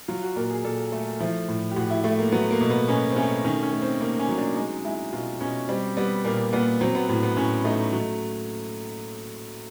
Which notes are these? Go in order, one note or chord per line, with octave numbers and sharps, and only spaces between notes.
F#3 F4
F#4
A#2 A#4
G#4
A#2 A4
A3 A4
F3 E4
A2
G4
A2 F#4
E4
A3 E4
A#3
F#3 B3
A#3
B2
B3
B2 C#4
C4
A3 C#4
D#3 C#4
C#4
A3
C4
C3 A#3
C#4
F#3
D4
G#3 D#4
G#3 E4
B2 F4
B2 C#4
G3 C4
G3 B3
A#2 A#3
A#2 B3
F#3 C4
B3
A2 B3
B3
A2 C#4
A3 D#4
F#3